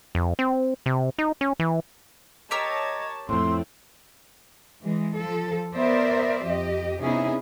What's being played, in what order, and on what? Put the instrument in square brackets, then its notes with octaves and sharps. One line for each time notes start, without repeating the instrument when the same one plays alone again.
[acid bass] F2
C4
C3
D#4
C#4
E3
[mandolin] G4 A#4 E6 [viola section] C#5 A5 [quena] D#5
[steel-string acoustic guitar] F2 A2 [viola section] A3 C4 [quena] C6
[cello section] E3 G#3
F3 A4
B3 A#4 C5 D5 E5
F2 G4 D#5
C3 B3 C#4 D#4 E4 G#4